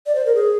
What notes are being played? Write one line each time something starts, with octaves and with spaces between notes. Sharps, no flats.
D5
C5
A#4
G#4